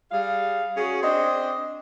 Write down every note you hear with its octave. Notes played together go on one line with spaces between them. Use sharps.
G3 G#4 F5
C#4 F#4 G#4
C4 D4 D#5